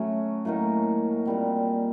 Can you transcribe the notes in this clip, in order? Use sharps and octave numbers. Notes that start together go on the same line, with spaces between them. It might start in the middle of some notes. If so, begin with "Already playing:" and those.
Already playing: F#3 A3 C#4
A2 F#3 A#3 D#4
A#2 G3 C4